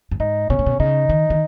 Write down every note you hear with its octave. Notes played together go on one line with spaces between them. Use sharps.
G2
G#2 D#4
B2 C#4
A#2
B2
C#3 D#4
D#3
D#3